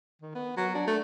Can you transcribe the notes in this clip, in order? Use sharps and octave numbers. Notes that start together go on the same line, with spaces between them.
D#3
B3
F#3
D4
A3